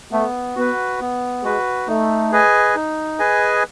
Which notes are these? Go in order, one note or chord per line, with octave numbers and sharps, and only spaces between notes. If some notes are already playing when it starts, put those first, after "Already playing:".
A3 B3
B3 F#4 B4
B3
G#3 F#4 B4
A3 D#4
G#4 B4 D#5 G#5
D#4
G#4 B4 D#5 G#5